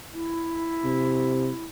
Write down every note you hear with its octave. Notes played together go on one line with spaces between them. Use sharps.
E4
C3